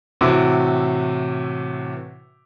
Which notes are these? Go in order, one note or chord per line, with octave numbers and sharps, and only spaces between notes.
A2 C3 E3 F#4 D6 E6